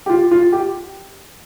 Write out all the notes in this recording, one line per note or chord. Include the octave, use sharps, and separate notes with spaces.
G4
F4
F4
G4